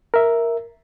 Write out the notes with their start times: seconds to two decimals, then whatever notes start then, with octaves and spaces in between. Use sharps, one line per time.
0.14 A#4 E5